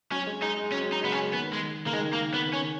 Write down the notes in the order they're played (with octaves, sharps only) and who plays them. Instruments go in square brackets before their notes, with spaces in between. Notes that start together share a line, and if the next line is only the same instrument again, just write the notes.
[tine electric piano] F#3 [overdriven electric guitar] C#4
[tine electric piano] G#3
[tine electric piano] G#3 [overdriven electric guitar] D#4
[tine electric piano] G#3
[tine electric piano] F#3 [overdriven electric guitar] C#4
[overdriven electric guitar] D#4
[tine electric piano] C#3 [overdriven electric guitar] B3
[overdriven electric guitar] C#4
[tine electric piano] D#3 [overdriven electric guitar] B3
[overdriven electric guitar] G#3
[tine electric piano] C#3 [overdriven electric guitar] A#3
[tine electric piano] D#3 [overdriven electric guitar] G#3
[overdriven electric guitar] A#3
B3
C#4